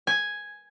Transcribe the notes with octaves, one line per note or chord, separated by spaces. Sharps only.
G#5